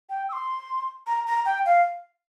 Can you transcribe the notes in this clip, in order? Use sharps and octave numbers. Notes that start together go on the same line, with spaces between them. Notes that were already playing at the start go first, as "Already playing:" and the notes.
G5
E6
C6
A#5
A#5
G5
F5